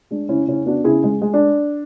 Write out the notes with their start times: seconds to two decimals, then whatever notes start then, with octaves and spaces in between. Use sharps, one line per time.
0.11 G#3 D4
0.29 C#3 C#4 E4
0.48 C#3 C#4 E4
0.66 B3 D4 F#4
0.84 C#3 E4 G#4
1.04 G#3
1.22 G#3
1.34 D4